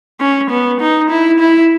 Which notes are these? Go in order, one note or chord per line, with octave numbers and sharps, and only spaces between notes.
C#4
B3
D#4
E4
E4